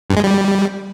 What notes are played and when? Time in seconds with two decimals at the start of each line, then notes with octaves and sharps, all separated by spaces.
0.10 G2
0.17 G#3
0.24 G3